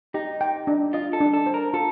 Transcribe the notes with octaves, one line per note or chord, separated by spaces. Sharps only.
D#4 G4
G5
D4
F4 D#5
A4
D4
A4
C5
A#4
F4 A4